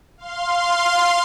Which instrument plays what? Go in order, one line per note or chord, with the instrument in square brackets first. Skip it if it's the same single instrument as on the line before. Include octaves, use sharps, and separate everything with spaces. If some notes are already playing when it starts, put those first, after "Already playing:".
[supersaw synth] F5 C6